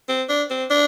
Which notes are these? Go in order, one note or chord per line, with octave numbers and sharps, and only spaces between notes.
C4
D4
C4
D4